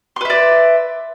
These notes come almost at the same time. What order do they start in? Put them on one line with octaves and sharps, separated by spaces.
C6 B4 E5 D5